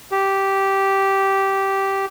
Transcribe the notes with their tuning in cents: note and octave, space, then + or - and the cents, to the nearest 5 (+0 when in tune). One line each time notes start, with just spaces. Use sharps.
G4 -10